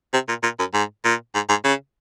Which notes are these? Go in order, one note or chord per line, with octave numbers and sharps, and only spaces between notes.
C3
A#2
A#2
F#2
G#2
A#2
G#2
G#2
C#3